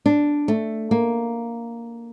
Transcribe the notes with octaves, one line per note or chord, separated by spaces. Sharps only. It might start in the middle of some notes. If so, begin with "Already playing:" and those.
D4
A3
A#3